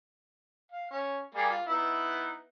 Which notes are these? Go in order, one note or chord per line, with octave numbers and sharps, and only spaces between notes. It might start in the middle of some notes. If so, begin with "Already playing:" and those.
F5
C#4
G3 A#3 G#4
F4
B3 D#4 E4